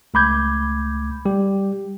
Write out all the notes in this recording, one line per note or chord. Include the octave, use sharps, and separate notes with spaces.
C#2 A3 B5 D6 G6 G#6
G3 G4